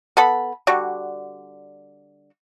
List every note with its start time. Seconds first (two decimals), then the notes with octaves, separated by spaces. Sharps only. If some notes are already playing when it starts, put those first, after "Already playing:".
0.17 B3 A4 B5
0.67 D3 G3 F#4